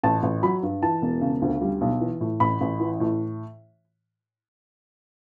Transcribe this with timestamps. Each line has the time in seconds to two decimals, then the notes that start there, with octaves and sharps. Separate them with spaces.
0.03 A1 A5
0.23 A1
0.43 F#3 B5
0.63 G2
0.82 E3 A5
1.02 E1
1.21 C#3
1.42 D2
1.61 G3
1.81 B1
2.01 E3
2.21 A2
2.40 A1 B5
2.61 A1
2.80 E3
3.00 A2